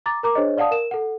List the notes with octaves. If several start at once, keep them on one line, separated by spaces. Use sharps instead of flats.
A#5 D6 A6
A#4 A#5 D6
D4 G#4 C5 C#5 D#5
D5 F5 F#5 A5 D#6
A#4 E7
A4 F#5